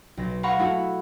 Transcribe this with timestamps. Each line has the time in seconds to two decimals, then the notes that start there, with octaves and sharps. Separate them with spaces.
0.17 B1 A#6
0.43 F5 F#5 A#5 B5 C#6
0.59 A3 E4 F#4